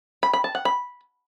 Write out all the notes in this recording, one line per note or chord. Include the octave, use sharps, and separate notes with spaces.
B5
B5
A5
F#5
B5